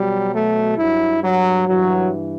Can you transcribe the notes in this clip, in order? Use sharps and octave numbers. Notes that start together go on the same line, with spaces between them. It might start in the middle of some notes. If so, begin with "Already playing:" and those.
Already playing: B2 F#3 G3
A3
G2 F#3 E4
F#3
G2 E3 F#3